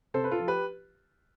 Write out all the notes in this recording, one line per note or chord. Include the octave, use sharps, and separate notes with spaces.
C3 A4 C5
B4
F4 A4
F3
G4 B4